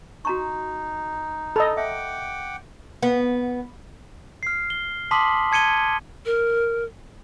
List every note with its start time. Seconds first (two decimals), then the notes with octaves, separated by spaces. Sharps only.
0.25 D#4 F#4 A#5 C#6
1.56 A4 D#5 B5
1.77 E5 F#5 G5 D6
3.03 B3
4.43 F6 C7
4.70 G7
5.11 A5 C6 D6 D#6 B6 F#7
5.52 A5 G#6 C#7 D#7 G7
6.26 A#4